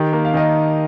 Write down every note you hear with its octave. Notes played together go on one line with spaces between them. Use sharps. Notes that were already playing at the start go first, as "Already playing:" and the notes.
Already playing: D#3 G4
A#3
F5
D#3 D#5